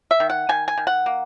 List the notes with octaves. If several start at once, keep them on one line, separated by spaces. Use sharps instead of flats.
E5
D#3
F#5
D#3 G#5
G#5
D#3
F#5
A#3